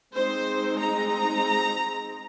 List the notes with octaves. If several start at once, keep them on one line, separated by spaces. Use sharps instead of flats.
G#3 C4 D#4 C5
A#5